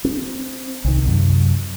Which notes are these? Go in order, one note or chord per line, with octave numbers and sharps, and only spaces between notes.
C4
C2 D#3
F#2 C3